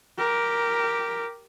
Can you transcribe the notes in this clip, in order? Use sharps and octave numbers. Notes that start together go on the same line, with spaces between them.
G4 A#4